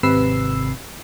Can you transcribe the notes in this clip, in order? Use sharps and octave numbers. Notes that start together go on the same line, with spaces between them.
G#1 C3 B4 E6 C7